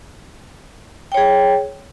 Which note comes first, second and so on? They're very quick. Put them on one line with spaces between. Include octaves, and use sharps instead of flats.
G5 C#5 G#4